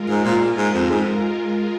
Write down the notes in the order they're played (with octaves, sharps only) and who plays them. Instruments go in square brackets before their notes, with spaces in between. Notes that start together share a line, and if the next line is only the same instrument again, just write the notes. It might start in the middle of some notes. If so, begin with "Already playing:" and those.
Already playing: [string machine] G#3 F4 A#4
[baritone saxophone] G#2
A#2
G#2
F2
G#2